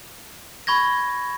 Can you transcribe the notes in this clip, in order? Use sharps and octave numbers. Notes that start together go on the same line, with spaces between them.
B5 C#6 G#6 A#6